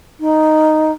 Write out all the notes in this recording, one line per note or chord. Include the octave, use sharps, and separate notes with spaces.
D#4